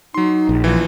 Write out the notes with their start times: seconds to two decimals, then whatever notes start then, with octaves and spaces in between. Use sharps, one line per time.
0.14 F#3 D#4 C6
0.49 A#1
0.64 E3 F3